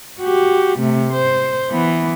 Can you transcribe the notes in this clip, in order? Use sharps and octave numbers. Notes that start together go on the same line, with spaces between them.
F#4 G4
C3 A3
C5
E3 B3